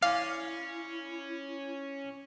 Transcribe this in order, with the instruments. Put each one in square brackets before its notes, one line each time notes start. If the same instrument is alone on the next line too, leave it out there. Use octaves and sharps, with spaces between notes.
[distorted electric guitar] C#4 [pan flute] E4 [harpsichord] D5 G#5 C6 [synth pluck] F5